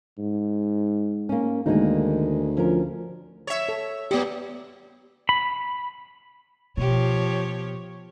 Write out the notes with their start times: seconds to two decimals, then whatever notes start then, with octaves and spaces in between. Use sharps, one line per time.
0.19 G#2
1.29 A#3 C#4
1.66 D2 D#3 G#3 A#3 D#4
2.57 F3 C#4 A#4
3.47 C#5 E5
3.69 A4
4.11 F#2 B3 G4
5.29 B5
6.77 B2 F3 G4 C#5